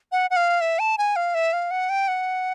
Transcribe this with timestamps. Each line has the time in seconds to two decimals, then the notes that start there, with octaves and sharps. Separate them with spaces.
0.12 F#5
0.30 F#5
0.36 F5
0.61 E5
0.79 A5
0.98 G#5
1.16 F5
1.35 E5
1.53 F5
1.71 F#5
1.90 G5
2.08 F#5